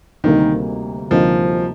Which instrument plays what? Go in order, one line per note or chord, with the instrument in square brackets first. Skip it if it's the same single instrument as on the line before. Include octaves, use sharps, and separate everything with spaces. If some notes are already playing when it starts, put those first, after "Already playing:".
[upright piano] D2 C3 G3 A#3 D#4 [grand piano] D#3
[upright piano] D2 C3 G3 A#3 D#4 [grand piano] F3